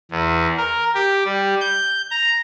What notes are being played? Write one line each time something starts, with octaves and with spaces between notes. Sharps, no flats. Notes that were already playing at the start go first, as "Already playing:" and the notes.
E2
A#4
G4
G3
G6
A#5